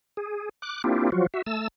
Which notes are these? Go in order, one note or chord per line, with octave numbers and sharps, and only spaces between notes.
G#4
D6 F#6
A#3 C4 D4 E4 F4 G4
F3 F#3 F4 F#4
F#4 E5
A3 A5 E6